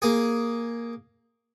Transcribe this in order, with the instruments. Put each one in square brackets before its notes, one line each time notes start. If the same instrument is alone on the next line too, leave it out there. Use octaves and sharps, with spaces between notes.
[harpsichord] A#3 G#4